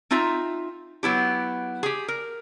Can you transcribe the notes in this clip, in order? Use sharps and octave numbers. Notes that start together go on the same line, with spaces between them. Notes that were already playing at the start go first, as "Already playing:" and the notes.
C4 D#4 F4 E5 A#5
F#3 B3 E4 G4
G4 G#4
A#4